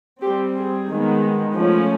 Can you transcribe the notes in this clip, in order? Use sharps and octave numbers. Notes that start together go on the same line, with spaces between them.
G3 C4 G4
G#4
D#3 G#3 B3
F3 A3 C#4